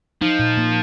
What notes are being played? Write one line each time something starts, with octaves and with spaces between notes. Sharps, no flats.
F3 D#4
A#2
A#3